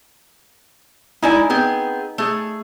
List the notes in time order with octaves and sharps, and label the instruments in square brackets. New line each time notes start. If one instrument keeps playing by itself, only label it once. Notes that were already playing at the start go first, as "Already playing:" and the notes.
[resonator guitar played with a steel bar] G#3 E4 D5 [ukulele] D#4 G#5
[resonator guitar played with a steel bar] B3 C4 G#4
A3 G#4